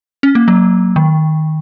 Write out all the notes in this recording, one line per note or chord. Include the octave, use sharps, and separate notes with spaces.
C#4
A#3
F#3
D#3